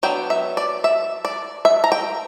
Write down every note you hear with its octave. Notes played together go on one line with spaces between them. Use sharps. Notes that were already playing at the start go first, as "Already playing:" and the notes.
F#3 B3 D4 G5
E5
D5
E5
D5
E5
A#5
G5